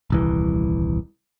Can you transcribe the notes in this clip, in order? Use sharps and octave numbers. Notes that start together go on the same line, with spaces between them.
D#1 C2 E3